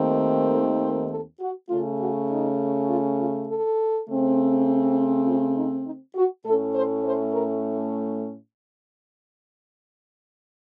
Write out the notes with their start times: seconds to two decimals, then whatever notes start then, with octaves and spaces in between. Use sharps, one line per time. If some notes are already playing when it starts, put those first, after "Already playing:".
Already playing: D#2 D#3 A3 C4
0.51 A4
0.80 C5
1.10 A4
1.40 F#4
1.69 C#3 A3 C#4 F4
2.00 F#4
2.29 D#4
2.88 F4
3.18 F4
3.47 A4
4.08 C#3 A3 C4
5.25 F4
5.55 D#4
5.86 D#4
6.15 F#4
6.44 A2 A3 C#4 A4
6.74 C5
7.04 C5
7.34 A#4